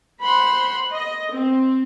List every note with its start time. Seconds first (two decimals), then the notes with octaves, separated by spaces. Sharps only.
0.21 C5 F#5 B5 C6
0.93 D#5
1.33 C4